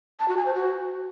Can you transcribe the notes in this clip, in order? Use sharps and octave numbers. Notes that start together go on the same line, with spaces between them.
A5
F#4
G#5
C5
F#4